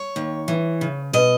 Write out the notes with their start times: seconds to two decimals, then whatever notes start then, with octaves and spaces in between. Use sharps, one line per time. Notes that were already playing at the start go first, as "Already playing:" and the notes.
Already playing: C#5
0.16 D#2
0.48 E3
0.81 C#3
1.13 B2 D#5